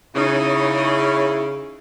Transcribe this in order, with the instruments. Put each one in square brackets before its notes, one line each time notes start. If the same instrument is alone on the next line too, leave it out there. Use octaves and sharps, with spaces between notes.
[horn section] C#3 [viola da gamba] D#4 [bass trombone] E4 [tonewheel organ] C#5